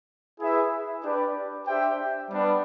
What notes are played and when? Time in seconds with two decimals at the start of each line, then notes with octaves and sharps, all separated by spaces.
0.39 E4 G#4 B4 E5
1.03 D4 G4 B4 D5
1.66 D4 G4 C5 E5 G5
2.29 G3 B3 D4